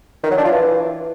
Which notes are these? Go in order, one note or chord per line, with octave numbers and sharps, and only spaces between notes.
D#3
F#3
D4
F4
E3